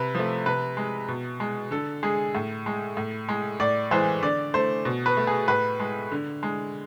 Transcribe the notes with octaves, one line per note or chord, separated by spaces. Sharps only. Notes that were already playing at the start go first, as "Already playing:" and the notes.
Already playing: C3 B4
F3 A3
C3 B4
G#3
B2
G#3
D3 A4
G#3 G#4
A2
G#3
A2
G#3
A2 D5
E3 G#3 C5
D3 D5
A3 C5
B2
B4
A3
G#4
A2 B4
G#3
D3
G#3